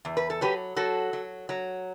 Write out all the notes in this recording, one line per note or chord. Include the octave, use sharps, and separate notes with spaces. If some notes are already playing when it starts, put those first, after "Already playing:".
E2
B4
A4
F#3 G4 B4
F#3 F#4 A4
F#3
F#3